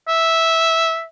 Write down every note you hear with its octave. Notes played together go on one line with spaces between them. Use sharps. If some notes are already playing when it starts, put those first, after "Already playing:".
E5